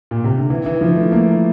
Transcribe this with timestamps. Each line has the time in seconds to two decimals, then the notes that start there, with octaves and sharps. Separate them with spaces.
0.11 A#2
0.24 C3
0.36 D3
0.50 E3
0.66 E3
0.81 F3
0.96 A3
1.12 A#3